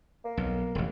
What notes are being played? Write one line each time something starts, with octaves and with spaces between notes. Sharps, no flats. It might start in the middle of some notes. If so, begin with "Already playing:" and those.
A#3
B1
E1 A1